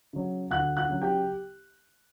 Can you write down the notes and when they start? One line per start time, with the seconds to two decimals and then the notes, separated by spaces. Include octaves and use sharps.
0.13 C#3 F#3
0.51 D2 F#5 F#6
0.77 F#5 F#6
0.89 C#3 F#3
1.02 G4 G5